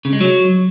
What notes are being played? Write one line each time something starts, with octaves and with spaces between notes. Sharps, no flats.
C#3
G#3
F#3